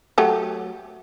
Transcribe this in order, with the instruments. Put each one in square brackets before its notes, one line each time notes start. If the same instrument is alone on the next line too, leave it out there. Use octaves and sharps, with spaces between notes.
[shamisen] F#3 A3 G4